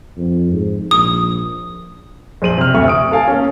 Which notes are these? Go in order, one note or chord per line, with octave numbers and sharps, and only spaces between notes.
F2
G#2
A#1 D#6
A#1 C5 D#7 F#7
C3 F6
D2 C3 E5 C#6
D#6 D7
A4 F5 G#5 A5
A#3 C#4